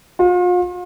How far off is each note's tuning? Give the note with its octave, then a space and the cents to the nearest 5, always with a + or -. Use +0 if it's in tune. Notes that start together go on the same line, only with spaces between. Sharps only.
F4 +40